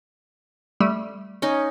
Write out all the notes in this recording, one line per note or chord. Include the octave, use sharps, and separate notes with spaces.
G3 A3
C#4 D#4